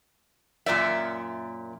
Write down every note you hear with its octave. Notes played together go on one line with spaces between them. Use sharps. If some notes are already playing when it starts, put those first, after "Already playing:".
F#2 A#2 D5 E5